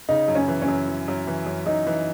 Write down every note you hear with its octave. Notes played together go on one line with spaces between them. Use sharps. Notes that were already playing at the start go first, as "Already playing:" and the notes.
C#3 D#4
F#2
C#4
E3
C#4
F#2
E3
F#2
E3
F#2
F#2 D#4
E3